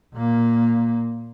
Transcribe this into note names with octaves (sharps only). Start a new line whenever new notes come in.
A#2 A#3